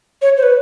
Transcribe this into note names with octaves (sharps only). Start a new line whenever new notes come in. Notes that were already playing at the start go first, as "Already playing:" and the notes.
C#5
C5
B4